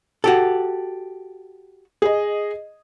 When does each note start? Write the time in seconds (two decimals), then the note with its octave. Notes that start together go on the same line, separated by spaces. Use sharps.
0.24 F#4 G4 A4
2.02 G#4 D#5